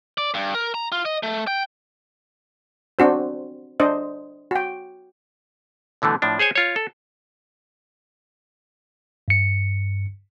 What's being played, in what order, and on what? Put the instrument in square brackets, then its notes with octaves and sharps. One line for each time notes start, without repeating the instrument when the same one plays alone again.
[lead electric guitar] D5
G2
A#4
A#5
F4
D#5
A3
G5
[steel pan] C4 D4 F#4 C5
D4 C5 D#5
F#4 G5
[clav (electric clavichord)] B2 D3 E3 A3
A2 F3 D4
G#4 C5 C#5 G#5
F4 C#5
A4
[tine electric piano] G2 C#7